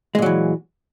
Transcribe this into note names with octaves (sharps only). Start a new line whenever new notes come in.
A#2 E3 F#3 G#3